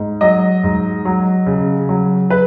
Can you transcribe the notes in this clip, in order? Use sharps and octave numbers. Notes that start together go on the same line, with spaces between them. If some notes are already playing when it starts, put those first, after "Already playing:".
Already playing: G#2
F#3 D#5
G#2
F#3
C#3
F#3
B4